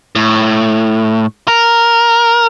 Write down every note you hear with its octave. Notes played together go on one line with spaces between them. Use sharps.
A2
A#4